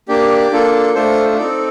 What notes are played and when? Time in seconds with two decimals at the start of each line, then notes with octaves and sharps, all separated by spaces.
0.08 A#3 D4 G4 D5
0.52 A#3 D4 F4 A4
0.95 A3 D4 F4 A4 C5
1.38 C4 D#4 A4 D5